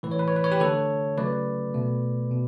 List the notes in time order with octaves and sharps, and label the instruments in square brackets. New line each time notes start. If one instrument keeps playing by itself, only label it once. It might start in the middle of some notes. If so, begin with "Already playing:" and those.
[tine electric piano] A2 E3 A3 B4
C#5
B4
C#5
B4
C#5
G4 B4
D3 A3 A4 C#5
C#3 F#3 A3 B4 D5
B2 A3
B2